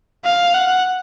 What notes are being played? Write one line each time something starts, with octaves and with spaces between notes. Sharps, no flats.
F5
F#5